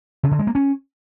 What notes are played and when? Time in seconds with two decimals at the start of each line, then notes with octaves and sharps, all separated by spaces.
0.23 C#3
0.31 D3
0.39 G#3
0.47 A#3
0.55 C#4